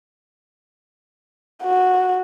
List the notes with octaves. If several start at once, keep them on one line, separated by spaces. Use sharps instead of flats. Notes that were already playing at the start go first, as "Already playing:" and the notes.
F#4